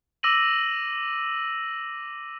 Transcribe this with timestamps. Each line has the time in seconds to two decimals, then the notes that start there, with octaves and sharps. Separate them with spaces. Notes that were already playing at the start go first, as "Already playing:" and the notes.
0.23 D6 E6 A#6 D#7 F#7